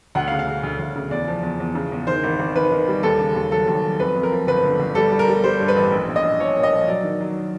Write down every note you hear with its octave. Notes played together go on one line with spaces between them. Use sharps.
D2 F#5
F5
C#3
F5
C#3
D2
D2
C#3
E2 D5
F3
E2
E2
C#3
E2
D#3 C5
G#1
G#1
D#3 B4
D#3
G3
D#2 A4
C#3
D#2
F#3 A4
D#2
F#3
F2 B4
F2
A#4
F3
G1 B4
D3
G1
G3 A4
G3
A#4
G3
G3 C5
G2
B4
A1
A#1
A#1
D#5
A#1
F3 C#5
A#2
D#5
F3
F#3 D5
D#3
F#3